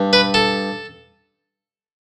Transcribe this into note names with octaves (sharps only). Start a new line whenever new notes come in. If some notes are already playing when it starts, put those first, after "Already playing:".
Already playing: G2
B4
A4